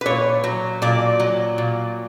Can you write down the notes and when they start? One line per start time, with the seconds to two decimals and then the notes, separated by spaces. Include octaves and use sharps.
0.01 B4
0.06 A#2 C#5
0.44 F#3
0.82 A#2 D5
1.20 F#3
1.58 A#2